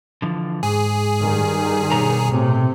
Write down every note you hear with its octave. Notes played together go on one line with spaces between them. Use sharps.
D3 E3 F3
G#2 G#4
G2 D#3
B2 C#5 A#5
A2 C3